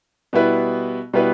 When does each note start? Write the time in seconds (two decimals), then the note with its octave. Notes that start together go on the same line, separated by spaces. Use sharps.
0.33 B2 G3 B3 E4 B4
1.13 B2 G3 B3 E4 B4